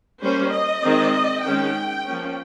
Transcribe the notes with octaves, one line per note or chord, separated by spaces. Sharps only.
G3 A#3 C#4 C5
D#5
D#3 G#3 C4
D#3 G#3 C#4 G5
F3 A#3 C#4